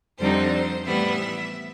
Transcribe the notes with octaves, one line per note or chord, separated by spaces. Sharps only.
F2 D3 G3 C4 D#4 C5
A2 E3 G3 B3 E5